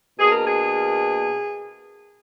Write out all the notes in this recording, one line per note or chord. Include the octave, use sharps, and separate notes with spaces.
B2 A#3 D4 G#4
A#4
G#4